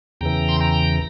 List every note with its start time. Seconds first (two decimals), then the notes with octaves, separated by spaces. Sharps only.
0.21 E2 C#3 E3 G5 A#5
0.49 C6
0.60 G5 A#5